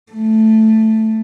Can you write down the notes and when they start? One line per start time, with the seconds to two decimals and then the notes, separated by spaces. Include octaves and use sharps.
0.13 A3